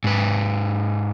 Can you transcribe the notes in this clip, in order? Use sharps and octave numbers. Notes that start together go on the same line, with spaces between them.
G#2 B4